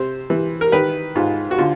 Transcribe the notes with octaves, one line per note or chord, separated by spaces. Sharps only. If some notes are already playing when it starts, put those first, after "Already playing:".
Already playing: C3 C5
E3
A#4
D#3 B4
G#2 F4
F#4
D3 F4